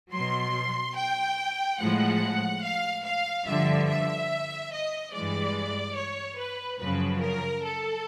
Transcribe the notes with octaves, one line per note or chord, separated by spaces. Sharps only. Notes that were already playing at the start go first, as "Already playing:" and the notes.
B2 F#3 C6
G5
A2 F3 G#3 F#5
F5
F5
G2 D3 F3 E5
E5
D#5
G2 E3 G#3 D5
C#5
B4
F#2 C#3 F3 B4
A#4
A4